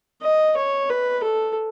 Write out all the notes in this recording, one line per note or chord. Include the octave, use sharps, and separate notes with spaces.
D#5
C#5
B4
A4